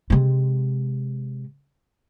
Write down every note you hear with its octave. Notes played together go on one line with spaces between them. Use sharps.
C3 G#3